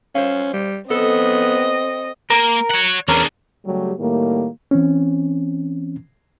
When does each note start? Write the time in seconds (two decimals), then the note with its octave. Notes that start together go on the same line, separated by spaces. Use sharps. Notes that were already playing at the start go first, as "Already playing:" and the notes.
0.15 C#4 C5 F5
0.54 G3
0.90 B3 C4 A4 D#5
2.30 A#3 A#4
2.70 C#5 F#5
3.08 E2 C#4 D4 G#4 A#4
3.66 C#3 F#3 G3 A3 G4
3.99 A2 D#3 G3 A#3
4.71 E3 C4 C#4